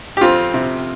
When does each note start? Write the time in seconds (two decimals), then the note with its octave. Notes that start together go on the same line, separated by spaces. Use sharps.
0.17 G4
0.21 F2 C4 F4
0.54 C3